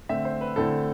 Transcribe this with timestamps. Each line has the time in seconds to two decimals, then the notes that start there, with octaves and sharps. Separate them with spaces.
0.09 D3 A3 C4 E5
0.25 C5
0.41 B4
0.56 D3 A3 C4 E4 A4